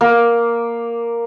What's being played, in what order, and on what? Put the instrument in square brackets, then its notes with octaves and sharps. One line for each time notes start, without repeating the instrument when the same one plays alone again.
[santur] A#3